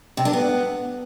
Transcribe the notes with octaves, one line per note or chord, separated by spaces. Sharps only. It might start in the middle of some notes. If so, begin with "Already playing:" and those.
C3
D4
B3